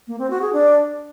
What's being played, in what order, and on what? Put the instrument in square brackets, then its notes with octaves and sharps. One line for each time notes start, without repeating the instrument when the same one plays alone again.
[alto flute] A#3
C4
F#4
G#4
D4